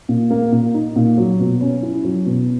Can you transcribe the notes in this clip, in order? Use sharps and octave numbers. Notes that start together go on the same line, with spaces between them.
A#2
A#3
A#2
D#4
A#2
F#3
B2
C#4
E4
F#3
B2